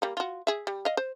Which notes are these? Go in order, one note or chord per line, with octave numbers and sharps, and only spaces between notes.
G3 A#3
F4 F#4
G#4 E5
G3
D#5 F5
C5